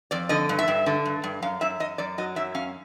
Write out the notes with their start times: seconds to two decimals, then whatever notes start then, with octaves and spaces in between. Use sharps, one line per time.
0.11 F2 D5
0.29 D3 D#5
0.49 G2
0.59 E5
0.68 G2
0.86 D3
1.06 G2
1.24 G2
1.42 F#2 F5
1.61 F#2 E5
1.80 F#2 D#5
1.98 F#2 D5
2.18 F#3 D#5
2.36 F#2 E5
2.55 C#4 F5